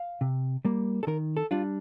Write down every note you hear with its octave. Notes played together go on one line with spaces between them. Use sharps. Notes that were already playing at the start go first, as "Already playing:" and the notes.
Already playing: F5
C3
G3 A#3
A4
D#3 A#4
A4
G3 D4 F4